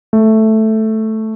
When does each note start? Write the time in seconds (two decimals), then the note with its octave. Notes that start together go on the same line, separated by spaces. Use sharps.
0.13 A3